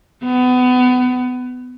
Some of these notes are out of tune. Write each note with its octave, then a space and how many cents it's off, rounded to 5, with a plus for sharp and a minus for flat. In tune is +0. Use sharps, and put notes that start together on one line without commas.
B3 +25